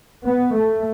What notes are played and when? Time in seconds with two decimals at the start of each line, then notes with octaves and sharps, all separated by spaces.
0.24 B3
0.55 A3